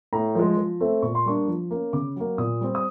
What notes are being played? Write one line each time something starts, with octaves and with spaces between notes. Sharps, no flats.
A2 A#5
F3 G#3
F3
A3 C4
A#2 C#6
C6
G3 A#3 D4 C#6
F3
A#3 C#4
C#3 D6
F#3 A#3
A#2 D#6
G3 C4
D#6